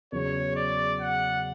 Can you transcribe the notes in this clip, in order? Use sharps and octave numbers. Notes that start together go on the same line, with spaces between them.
E2 C#3 F#3 C#5
D5
F#5